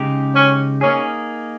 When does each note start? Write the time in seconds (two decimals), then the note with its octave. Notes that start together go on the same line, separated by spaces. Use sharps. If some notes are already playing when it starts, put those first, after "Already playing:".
Already playing: C#3 G#3 D#4 G4
0.34 C#4
0.81 A#3 C#4 D#4 G#4